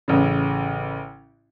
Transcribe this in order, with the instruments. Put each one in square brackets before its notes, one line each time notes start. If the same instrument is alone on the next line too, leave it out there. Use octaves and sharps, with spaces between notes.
[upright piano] A1 C#3